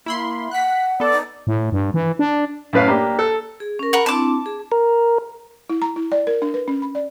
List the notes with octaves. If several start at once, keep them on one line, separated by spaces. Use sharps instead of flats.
A#3 E4 B5 C6
F#5 F#6 B6
B3 A4 D5
D#4
A2
G2
E3
D4
F#2 A2 B4 F5
A#3 D4 G4
A4
G#4
C#4 A#4
A#4 F#5 B5
C4 D4 E4 A5 D6
G#4
A#4
E4
A#5
E4
D5
A#4
D4
B4
C#4
B5
D5